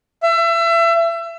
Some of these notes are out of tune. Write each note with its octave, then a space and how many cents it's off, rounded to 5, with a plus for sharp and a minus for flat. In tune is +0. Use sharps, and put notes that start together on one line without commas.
E5 +30